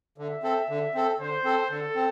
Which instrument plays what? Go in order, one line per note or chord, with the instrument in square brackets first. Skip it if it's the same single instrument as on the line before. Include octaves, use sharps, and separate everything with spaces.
[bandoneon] D3 [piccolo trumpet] E5
[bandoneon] C4 A4
D3
C4 A4
[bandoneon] D3 [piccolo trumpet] C5
[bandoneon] C4 A4
[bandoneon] D3 [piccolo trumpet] A4
[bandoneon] C4